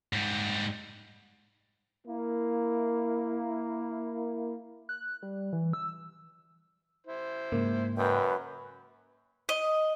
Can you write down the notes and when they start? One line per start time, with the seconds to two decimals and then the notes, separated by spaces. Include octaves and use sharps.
0.13 G#2 G3
2.07 A#3 E4
4.89 F#6
5.23 G3
5.53 E3
5.73 E6
7.07 E4 C5
7.52 G#2 C#3 A#3
7.98 F#2 B4 D#5 G5
9.49 D#5